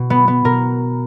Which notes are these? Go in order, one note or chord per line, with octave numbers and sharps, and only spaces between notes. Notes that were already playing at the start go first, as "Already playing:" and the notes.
Already playing: B2
B3
B3
B2 A#4